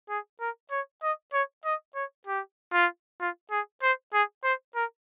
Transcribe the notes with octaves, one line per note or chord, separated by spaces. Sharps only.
G#4
A#4
C#5
D#5
C#5
D#5
C#5
G4
F4
F4
G#4
C5
G#4
C5
A#4